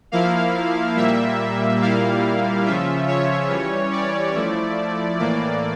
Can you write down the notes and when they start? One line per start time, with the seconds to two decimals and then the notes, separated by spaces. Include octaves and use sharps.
0.12 F3 A#3 E4 F5
0.96 A#2 G3 A#3 E5
1.82 A#2 G3 A#3 E4 F5
2.65 C#3 F3 C#4 F4 E5
3.08 C#5
3.50 E3 G3 C#4
3.92 D5
4.34 F3 A3 E4
5.19 A2 E3 A#3 D5